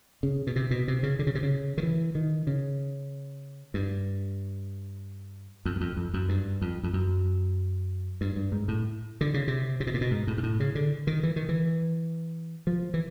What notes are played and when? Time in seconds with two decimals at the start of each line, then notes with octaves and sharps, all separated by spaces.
0.23 C#3
0.47 B2
0.56 C3
0.71 B2
0.88 C3
1.03 C#3
1.19 D3
1.27 C#3
1.35 C3
1.43 C#3
1.78 D#3
1.83 E3
2.15 D#3
2.47 C#3
3.74 G2
5.65 F2
5.76 F#2
5.81 F2
5.97 F2
6.14 F#2
6.29 G2
6.62 F2
6.83 F2
6.93 F#2
8.21 G2
8.36 G2
8.52 G#2
8.68 A2
9.21 D3
9.34 C#3
9.48 C3
9.80 C3
9.87 B2
9.94 A#2
10.01 B2
10.11 G#2
10.27 A2
10.38 G#2
10.43 A2
10.60 C#3
10.75 D3
11.07 D#3
11.23 E3
11.36 D#3
11.49 E3
12.67 F3
12.94 E3